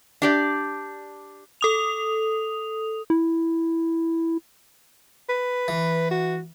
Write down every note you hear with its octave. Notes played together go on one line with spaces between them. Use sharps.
D4 G4 D5
A4 D#6 F7
E4
B4
E3
F#4